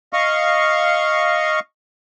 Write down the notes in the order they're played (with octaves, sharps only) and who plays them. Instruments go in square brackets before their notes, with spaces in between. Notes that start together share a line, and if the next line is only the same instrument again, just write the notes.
[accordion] D#5 F5 C#6